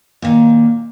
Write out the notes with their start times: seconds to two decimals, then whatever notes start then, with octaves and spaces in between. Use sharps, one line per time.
0.22 A#2 D#3